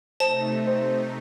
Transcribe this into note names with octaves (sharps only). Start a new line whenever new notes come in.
C3 A3 D#4 C5 A5
C4